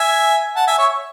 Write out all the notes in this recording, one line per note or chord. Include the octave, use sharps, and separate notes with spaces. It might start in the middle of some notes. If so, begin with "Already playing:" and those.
Already playing: E5 G#5
F#5 A5
E5 G#5
C#5 E5